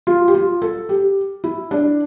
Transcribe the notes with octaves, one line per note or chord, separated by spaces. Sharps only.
F4
G4
F4
A4
G4
E4
D4